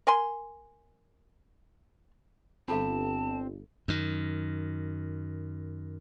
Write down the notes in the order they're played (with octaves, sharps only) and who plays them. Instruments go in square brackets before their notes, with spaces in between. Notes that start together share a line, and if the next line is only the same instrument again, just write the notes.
[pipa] A#4 G#5 C6
[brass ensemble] G1 [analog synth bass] C4 [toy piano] F4 A4 F5 [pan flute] A5
[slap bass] F#2 D#3